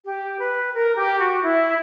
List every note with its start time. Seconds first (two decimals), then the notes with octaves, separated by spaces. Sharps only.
0.04 G4
0.39 B4
0.74 A#4
0.97 G4
1.20 F#4
1.43 E4